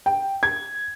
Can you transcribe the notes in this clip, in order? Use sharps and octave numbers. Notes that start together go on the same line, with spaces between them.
G5
G#6